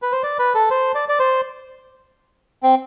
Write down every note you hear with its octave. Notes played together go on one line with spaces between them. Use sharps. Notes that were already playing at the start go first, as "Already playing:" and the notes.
B4
C5
D5
B4
A4
C5
D5
D5
C5
C4